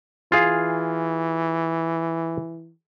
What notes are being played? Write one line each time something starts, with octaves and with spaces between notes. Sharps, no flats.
E3 F4 G#4 F5